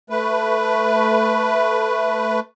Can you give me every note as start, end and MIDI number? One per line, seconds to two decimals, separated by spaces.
0.10 2.40 57
0.10 2.40 71